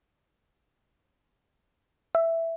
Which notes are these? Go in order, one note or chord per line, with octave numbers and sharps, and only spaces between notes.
E5